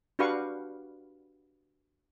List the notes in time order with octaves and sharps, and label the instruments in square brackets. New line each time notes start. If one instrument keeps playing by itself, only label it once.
[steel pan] D4 F#4 G4 B4 F5 C#6